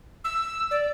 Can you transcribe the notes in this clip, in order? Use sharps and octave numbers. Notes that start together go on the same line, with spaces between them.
E6
D5